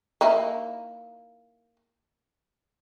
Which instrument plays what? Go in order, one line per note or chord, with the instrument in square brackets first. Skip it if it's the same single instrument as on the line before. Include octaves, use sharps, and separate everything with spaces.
[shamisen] A#3 D#4 E4